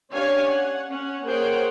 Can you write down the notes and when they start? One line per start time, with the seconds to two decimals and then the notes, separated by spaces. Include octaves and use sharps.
0.13 C#4 D4 G4 C#5 F5 G#5
0.49 F#5
0.89 C#4 F#5
1.25 A#3 G#4 C5 C#5 F#5 G5